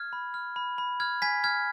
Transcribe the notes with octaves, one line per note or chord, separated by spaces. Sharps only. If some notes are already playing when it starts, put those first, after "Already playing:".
Already playing: F6 G#6
B5
F6
B5
B5
F6 G#6
G#5 G#6 B6
F6 G#6